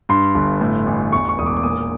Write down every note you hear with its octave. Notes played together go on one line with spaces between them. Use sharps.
G2 C6
G1
A2
A1
E2 C#6
C#6
E1 D#6
D6
D6
A#2 D#6